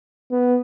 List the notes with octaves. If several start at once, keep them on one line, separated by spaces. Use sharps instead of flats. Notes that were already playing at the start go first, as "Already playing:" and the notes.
B3